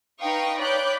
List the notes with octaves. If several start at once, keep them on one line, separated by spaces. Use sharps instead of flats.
D#4 B4 F5 G5 C#6 D#6
C#5 D5 B5 D6 F#6 G6